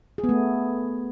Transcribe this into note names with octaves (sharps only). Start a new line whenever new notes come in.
G#4
B3
A3